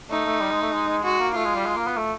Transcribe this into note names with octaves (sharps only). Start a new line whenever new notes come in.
A3 D#4
A3
G3
G#3
A3
G#3
G#3
G#3 F#4
A#3
A3 F4
G#3
G3
G#3
A#3
B3
A3